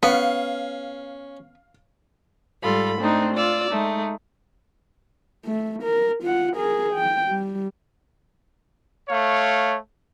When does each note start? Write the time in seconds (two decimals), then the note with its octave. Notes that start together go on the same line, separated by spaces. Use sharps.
0.03 B3 C#4 F5
2.62 G#2 G3 F4 A4 B5
2.98 A3 C4 D4 D#4
3.35 F4 D5 E6
3.71 G#3 A3 D#4
5.45 A3
5.83 A#4
6.23 F4 F#5
6.56 G#4 A#4
6.94 G5
7.28 G3
9.09 A3 C#5 F5